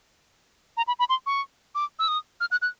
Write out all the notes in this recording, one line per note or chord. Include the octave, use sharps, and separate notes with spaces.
A#5
B5
B5
C6
C#6
D6
E6
D#6
F6
F#6
F#6